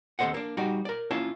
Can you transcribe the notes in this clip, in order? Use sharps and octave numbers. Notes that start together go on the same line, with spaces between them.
D#2 C3 A4 C5 D#5 F#5
A#3 D4
G3 D#4 F#4 D5
A#4 D5
A#3 C#4 E4 F4 E5 A5